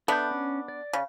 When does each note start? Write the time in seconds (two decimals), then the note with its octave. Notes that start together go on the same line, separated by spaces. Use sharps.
0.08 B3 D4 A4 E5 G6
0.31 C#4
0.68 D5
0.93 C#3